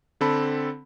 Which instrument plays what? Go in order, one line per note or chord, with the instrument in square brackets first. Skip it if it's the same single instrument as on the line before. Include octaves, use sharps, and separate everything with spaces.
[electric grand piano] D3 C4 A4 B5